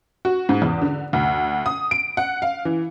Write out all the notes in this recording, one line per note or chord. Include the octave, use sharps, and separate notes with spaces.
F#4
G#2
E2
D3
D2
D#6
D7
F#5
F5
E3